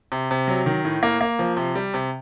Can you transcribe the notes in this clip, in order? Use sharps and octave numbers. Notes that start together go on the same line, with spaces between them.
C3
C3
F#3
D#3
A2
A#3
A#3
F3
C3
G3
C3